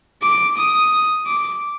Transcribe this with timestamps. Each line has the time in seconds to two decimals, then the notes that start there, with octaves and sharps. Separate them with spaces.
0.22 D6
0.57 D#6
1.26 D6